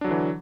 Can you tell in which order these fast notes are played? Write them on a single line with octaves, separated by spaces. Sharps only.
D4 F#3 D3 E3